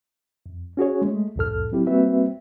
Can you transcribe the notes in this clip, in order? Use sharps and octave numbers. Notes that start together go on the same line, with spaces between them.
F2
C#4 F#4 G#4 C#5
G#3 A3
C2 F2 A2 A4 F6
F#3 C4 E4 G4
G3 A#3 C4 F#4 B4 E5